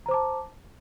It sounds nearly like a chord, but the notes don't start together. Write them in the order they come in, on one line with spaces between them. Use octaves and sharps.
A#5 C5 D6 A5